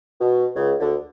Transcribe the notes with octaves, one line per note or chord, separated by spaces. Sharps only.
B2
C#2 C#3
D2 D3